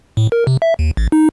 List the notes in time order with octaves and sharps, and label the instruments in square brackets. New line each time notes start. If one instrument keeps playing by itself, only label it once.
[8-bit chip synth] A2
A#4
C3
E5
D#2
A1
D#4